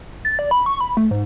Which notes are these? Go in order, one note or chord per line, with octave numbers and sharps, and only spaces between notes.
A6
D5
B5
C#6
B5
A3
G#2